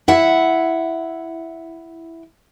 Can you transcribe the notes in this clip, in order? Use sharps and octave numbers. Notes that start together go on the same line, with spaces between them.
E4 E5 F#5